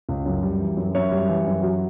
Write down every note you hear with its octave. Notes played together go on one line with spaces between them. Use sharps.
C#2
F#2
G3
E3
F#2
F#2 C#5 E5
G3
E3
F#2
F#3